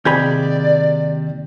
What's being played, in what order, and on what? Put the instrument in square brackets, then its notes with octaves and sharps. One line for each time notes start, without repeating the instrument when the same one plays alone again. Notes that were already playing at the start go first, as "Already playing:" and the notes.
[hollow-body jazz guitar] D#2 G#4 B5 [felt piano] C3 G6 [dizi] D5